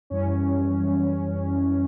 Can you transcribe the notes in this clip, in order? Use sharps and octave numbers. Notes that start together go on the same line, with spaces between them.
F#2 E3 G3 C#4